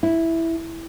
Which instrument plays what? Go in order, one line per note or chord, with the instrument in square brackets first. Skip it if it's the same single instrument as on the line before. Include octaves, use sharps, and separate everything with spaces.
[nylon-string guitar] E4